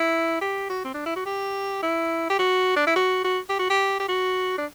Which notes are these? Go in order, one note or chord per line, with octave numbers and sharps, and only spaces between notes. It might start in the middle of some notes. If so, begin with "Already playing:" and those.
Already playing: E4
G4
F#4
C4
D4
E4
F#4
G4
E4
G4
F#4
D4
E4
F#4
F#4
G4
F#4
G4
G4
F#4
D4